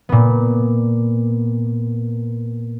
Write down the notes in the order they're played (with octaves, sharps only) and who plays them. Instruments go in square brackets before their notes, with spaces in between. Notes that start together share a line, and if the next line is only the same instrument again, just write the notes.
[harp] A#2 B3